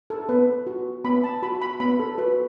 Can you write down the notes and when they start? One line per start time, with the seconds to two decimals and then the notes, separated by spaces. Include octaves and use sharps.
0.10 A4
0.29 B3 B4
0.67 F#4
1.04 B3 B5
1.24 A5
1.42 F#4 B5
1.62 B5
1.80 B3 B5
2.00 A4
2.18 F#4 B4